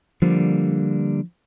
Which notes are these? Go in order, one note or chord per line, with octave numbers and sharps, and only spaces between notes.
D3 F3 G3 A#3